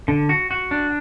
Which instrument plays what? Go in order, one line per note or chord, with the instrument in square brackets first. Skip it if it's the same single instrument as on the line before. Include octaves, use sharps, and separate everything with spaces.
[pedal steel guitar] D3
F#4
F#4
D4